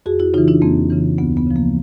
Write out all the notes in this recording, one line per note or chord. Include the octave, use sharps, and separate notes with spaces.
F2 F#4 G#4
E4 F#4
C#3 E3 D#4 F4
D4 E4
F2 A#3 C4
C#3 E3
D2 B3
B3
C#3 F3
A#3